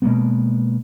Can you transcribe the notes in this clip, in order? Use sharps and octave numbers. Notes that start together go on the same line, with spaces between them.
B2 G#3 A#3 B3